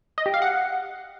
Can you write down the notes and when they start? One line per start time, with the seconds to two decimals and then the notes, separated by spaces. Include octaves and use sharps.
0.18 D#5
0.26 G4
0.34 F5
0.42 F#5